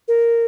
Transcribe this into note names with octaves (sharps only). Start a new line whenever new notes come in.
A#4